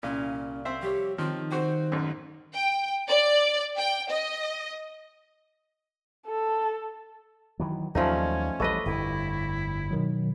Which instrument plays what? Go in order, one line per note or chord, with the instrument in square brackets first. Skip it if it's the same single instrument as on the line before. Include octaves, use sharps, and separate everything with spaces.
[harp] C2 F5 G#6 [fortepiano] A#2 [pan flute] C#4
[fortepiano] C4 C5 E5
[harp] G3 C#5 [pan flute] G4
[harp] D#3 [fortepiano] F3 [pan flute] C4
[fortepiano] C4 F#4 [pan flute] C5
[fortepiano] A1 F#2
[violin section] G5
D5
G5
D#5
[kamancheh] A4
[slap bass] D#3 E3 F#3
[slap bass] D#2 F#3 [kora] F3 A3 D#4 [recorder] C#4 [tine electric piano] D5 F5
[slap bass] A1 G3 [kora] A4 B4 D#5 [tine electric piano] C#6 D6 A#6
[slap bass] G1 F2 A2 [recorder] E4
[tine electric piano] B2 D#3 F#3